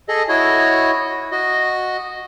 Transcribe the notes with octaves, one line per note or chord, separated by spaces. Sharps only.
G#4 A4 D#5
E4 F#4 C#5 D#5
F#4 D#5